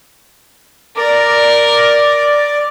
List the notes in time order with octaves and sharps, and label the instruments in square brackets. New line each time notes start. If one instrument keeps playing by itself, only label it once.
[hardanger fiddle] A#4 [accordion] D5 D6